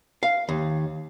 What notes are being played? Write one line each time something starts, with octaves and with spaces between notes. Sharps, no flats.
F5
D#2